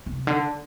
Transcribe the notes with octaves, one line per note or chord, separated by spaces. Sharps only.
C3
D3